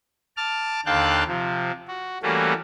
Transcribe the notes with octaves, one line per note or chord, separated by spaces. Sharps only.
A5 D6 F6
D#2 D3 F5 G5 A5 F#6
C3 F3
F#4
E3 G3 A3 A#3 C#4 F#4